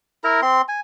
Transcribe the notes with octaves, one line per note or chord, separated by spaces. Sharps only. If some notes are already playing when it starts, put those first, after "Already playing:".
E4 A#4 A#5
C4 C6
G#5